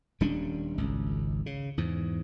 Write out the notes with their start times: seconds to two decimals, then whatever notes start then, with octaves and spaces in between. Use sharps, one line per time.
0.21 D#1 G3 C#4 D4
0.78 G#1 C#2
1.46 C#3
1.78 E2 G#2